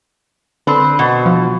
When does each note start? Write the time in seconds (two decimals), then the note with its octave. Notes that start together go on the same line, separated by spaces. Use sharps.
0.67 D3 C4 B4
0.99 B2
1.26 F3